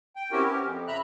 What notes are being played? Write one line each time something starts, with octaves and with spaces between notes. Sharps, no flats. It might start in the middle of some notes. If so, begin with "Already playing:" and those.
G5
C4 C#4 E4 F#4 G4 A#4
B3 C#4 G4 A#4
F2
C#3 E5 A#5 B5 F#6